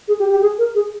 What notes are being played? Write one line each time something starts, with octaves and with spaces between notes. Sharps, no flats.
G#4
G4
G4
G#4
A#4
G#4